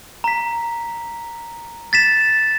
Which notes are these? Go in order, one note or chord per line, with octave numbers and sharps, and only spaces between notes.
A#5 B6
A6 B6 E7